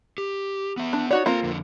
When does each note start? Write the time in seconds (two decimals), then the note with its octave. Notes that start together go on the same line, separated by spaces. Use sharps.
0.18 G4
0.77 B3 E5
0.93 D4
1.11 D#4 F#4 C#5 D5
1.26 A#3 C4 F4 A4 A#5
1.44 F2 D3